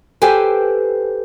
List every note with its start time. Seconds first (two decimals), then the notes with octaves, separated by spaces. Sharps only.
0.22 G4 A4 B4 C5 G5 G#5